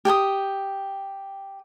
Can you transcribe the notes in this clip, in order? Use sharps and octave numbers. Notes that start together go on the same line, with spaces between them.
G4 G5 G#5 D#6